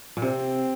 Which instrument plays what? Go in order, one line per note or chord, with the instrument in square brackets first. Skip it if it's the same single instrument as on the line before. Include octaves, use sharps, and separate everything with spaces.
[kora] A#2
[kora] C3 [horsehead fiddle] C4